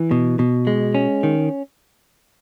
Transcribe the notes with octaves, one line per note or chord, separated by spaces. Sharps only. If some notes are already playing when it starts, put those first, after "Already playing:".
Already playing: E3
B2
B2
G#3
C#4
D#3